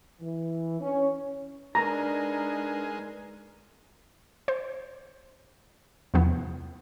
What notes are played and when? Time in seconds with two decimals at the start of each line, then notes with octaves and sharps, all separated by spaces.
0.21 E3
0.81 C#4
1.75 G#3 D4 D#4 A#4 B4 A#5
4.48 C5
6.14 E2 C3 F3 B3